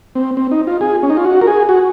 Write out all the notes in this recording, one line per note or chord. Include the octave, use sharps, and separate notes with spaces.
C4
C4
D#4
F4
G#4
C#4
D#4
F4
F#4
A#4
G#4
F#4